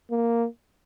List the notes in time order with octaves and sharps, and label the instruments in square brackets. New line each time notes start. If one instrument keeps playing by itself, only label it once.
[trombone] A#3